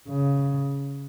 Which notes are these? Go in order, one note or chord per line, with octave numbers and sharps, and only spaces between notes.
C#3